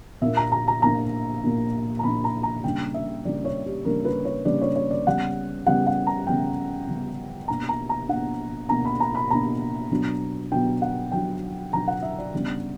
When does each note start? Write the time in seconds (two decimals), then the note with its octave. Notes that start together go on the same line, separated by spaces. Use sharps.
0.22 A#2 A#3 D4 E5
0.37 A#5
0.52 A#5
0.68 A#5
0.82 A#2 A#3 D4 A#5
1.44 A#2 A#3 D4
1.99 A#5
2.03 A#2 A#3 D4 B5
2.24 A#5
2.43 A#5
2.64 C#3 G3 A#3 D4 G5
2.94 E5
3.24 C#3 G3 A#3 D4 D5
3.45 C#5
3.66 G4
3.85 C#3 G3 A#3 D4 A#4
4.05 B4
4.25 C#5
4.45 C#3 G3 A#3 D4 D5
4.61 C#5
4.76 C#5
4.91 D5
5.06 C#3 G3 B3 F#5
5.66 C#3 G3 B3 F#5
5.87 F#5
6.07 A#5
6.27 C#3 G3 B3 G5
6.88 C#3 G3 B3
7.48 B2 A#3 D4 A#5
7.69 A#5
7.89 A#5
8.09 B2 A#3 D4 F#5
8.69 B2 A#3 D4 A#5
8.85 B5
9.00 A#5
9.15 B5
9.30 B2 A#3 D4 A#5
9.91 B2 F#3 B3 D4
10.51 B2 F#3 B3 D4 G5
10.82 F#5
11.12 B2 F#3 B3 D4 G5
11.72 B2 F#3 B3 D4 A#5
11.88 F#5
12.02 E5
12.18 D5
12.34 C#3 G3 B3 D4